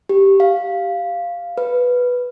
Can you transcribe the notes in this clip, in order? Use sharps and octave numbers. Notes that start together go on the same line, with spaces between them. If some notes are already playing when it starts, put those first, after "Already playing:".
G4
F5
B4